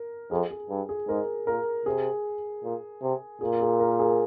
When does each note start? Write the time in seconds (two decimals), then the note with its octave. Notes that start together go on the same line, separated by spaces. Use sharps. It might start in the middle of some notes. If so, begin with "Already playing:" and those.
Already playing: A#4
0.31 F2 G#4
0.51 G#4
0.70 G2
0.89 G#4
1.08 G#2 A#4
1.47 A#2 A#4
1.86 C3 G#4
2.63 A#2
3.02 C3
3.41 A#2 G#4
3.61 G#4
3.80 A#4
3.99 G#4